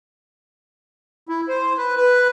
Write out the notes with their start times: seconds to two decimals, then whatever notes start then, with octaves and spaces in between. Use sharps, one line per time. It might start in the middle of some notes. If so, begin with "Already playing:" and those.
1.29 E4
1.48 C5
1.78 B4
1.97 B4